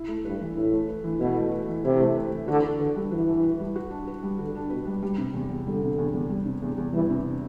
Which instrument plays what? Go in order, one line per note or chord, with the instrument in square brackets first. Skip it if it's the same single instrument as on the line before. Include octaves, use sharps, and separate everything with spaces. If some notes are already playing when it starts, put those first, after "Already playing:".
Already playing: [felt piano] E4
A3
[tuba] G2 [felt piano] B4
[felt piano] E3
[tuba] A2 [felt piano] E4
[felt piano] A3
B4
E3
[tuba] B2 [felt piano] E4
[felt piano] A3
B4
E3
[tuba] C3 [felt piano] E4
[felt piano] A3
B4
E3
[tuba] D3 [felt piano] F#4
[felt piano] D4
[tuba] D3 [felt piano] B4
[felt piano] G3
[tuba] E3 [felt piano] F#4
[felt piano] D4
B4
G3
F#4
D4
B4
G3
[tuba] D3 [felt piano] F#4
[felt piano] D4
[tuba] B2 [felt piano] B4
[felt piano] G3
G3
C3
E2
E2
[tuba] D3 [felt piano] G3
[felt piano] C3
E2
E2
G3
C3
E2
E2
[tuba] E3 [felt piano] G3
[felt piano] C3